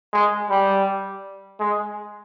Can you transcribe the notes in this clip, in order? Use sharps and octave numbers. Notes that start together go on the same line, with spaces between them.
G#3
G3
G#3